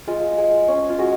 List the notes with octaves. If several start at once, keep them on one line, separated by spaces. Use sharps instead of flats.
G#3 F4
G#3
C#4
F4
G#3 F#4